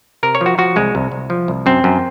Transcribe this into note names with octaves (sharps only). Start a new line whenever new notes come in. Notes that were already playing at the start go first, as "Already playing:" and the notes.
C3 A#4
C#5
F3
F#4
F3 F#4
C2 G#3
C2
C2
F3
C2
F#2 C4
F#2